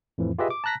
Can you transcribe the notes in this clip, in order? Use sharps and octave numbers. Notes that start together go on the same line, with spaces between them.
F2 A2 E3 F3
F4 G4 G#4 B4 D#5 E5
D6
A5 A#5 F#6 A#6 B6